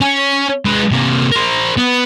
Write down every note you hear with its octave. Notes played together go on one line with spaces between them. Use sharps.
C#4
G#3 B4
C3 A#3
A#4 C5
B3